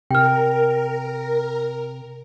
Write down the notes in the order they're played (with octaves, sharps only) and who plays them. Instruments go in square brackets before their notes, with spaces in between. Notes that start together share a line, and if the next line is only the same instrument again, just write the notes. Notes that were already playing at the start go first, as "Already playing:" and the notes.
[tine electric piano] C3 [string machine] A#4 [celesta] G5 F6